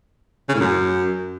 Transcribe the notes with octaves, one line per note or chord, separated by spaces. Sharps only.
C#3
A2
F#2